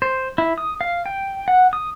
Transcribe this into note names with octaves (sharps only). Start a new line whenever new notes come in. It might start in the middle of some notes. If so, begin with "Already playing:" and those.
C5
E4
D#6
F5
G5
F#5
D#6